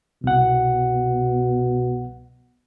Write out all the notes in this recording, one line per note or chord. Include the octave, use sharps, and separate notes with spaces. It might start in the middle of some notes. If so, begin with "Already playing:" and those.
C2 B2 F#5